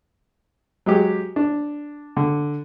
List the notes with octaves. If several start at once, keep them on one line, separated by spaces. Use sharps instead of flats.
F#3 G#3 G4 G#4
D4
D3